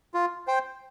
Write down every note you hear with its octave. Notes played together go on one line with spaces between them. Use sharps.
F4
C5 G5